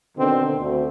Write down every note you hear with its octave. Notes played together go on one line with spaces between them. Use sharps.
B2 D3 D#3 C4
D2